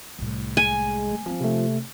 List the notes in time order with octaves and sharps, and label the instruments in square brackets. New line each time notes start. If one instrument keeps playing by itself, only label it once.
[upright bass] C2 A2
[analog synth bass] G#3 [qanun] G#5
[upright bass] A3
[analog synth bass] F3 [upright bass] A#3 C4
[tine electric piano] C3 A3